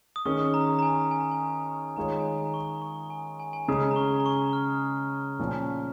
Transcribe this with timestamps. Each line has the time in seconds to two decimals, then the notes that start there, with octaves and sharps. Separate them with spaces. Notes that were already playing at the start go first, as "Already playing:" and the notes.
0.16 D#6
0.25 D#3 C#4 G#4 C#6
0.54 A#5
0.79 A#5
0.83 G#5
1.11 G#5
1.20 A#5
1.31 G#5
1.96 D#3 G#3 F4 G#4 C#5 A#5
2.19 G#5
2.25 A#5
2.38 G#5
2.45 A#5
2.54 C#6
2.82 C#6
3.10 G#5
3.40 G#5
3.53 G#5
3.68 C#3 G#3 C#4 G#4 A#5
3.91 A#5
3.96 C#6
4.20 A#5
4.26 C#6
4.53 F6
5.39 A#2 F3 C#4